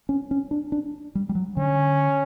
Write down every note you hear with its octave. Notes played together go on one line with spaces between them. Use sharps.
C#4
C#4
D4
D4
G3
G3
F#3
D3 C#4